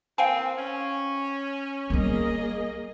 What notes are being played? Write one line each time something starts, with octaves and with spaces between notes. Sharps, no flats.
E3 A#3 C4 F5 G5 G#5
C#4
G3 A#3 B3 G#4 D#5